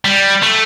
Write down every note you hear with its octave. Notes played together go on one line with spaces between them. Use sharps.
G3
A3